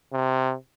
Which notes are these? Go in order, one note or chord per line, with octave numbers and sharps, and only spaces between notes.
C3